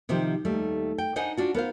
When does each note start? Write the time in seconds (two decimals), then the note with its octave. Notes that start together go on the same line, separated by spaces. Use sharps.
0.09 C3 D#3 F3 G4 C5
0.45 D#2 G3 A3
0.98 G5
1.16 D4 D#4 C5 D#5 F#5 G#5
1.37 D4 F4 F#4
1.54 B3 A#4 C5 F5